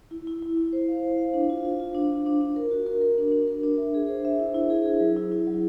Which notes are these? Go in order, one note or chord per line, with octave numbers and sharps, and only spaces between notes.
E4
E4
E4
E4
C5
F5
C5
F5
D4
F4
F4
F4
D4
D4
D4
D4
A#4
F#4
A#4
A#4
D4
D4
A#4
D4
E5
G#4
C5
E5
E4
E4
G#4
G#4
F#3
E4
E4
F#3